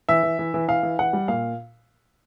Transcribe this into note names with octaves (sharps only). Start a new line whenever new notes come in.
E3 E5
E3
E3
E3
E3 F5
E3
E3 F#5
G3
A#2 F5